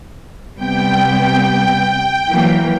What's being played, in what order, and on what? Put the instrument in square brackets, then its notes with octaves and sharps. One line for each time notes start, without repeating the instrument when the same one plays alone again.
[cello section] C3 G3 B3 [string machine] G5
[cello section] E3 F#3 A#3